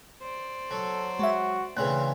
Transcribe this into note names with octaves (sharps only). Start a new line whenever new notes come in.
C5 D5
F#3 A4
G#3 F#4 E5
D2 C#3 E3 C4 F#6